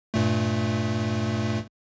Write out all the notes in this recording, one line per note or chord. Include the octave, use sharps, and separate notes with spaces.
G2 A#2 A3